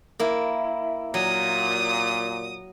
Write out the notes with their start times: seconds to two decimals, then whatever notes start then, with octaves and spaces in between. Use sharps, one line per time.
0.20 A#3 E4
1.14 A#2 F#3 D#6